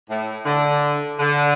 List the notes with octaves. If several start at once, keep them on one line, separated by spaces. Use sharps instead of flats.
A2
D3
D3